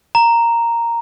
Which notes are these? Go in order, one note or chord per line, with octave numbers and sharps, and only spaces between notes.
A#5